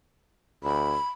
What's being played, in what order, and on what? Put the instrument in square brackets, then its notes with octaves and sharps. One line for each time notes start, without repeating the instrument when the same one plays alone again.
[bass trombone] D2 [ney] B5